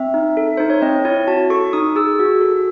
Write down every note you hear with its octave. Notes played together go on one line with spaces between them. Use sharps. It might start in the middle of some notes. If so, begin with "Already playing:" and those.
Already playing: C4 E5
D#4
A4
D#4 C5
C#5
C4 D#5
E4 C#5
F#4 A5
A4 C#6
D#4 D#6
G#4 E6
F#4
A4